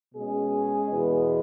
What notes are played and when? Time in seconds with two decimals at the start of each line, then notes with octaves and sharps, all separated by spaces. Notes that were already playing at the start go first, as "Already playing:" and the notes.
0.14 B2 G#3 C#4 G#4
0.87 E2 B2 G#3 B3